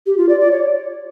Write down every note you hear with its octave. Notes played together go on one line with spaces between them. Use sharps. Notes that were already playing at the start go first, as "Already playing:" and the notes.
G4
F4
D5
D5
C#5